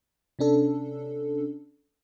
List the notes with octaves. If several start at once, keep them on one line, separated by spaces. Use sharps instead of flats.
C3 C#4 D4 A4